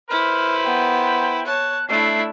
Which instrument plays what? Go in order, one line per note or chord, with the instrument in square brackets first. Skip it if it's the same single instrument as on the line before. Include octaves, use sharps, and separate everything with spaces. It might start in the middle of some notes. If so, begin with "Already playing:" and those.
[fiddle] E4 [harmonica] B4 C5 [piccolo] F6
[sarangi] B3 [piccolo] G5
[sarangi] C#5 [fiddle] A5 [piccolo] F#6
[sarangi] A3 [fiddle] D4 E4 [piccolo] C7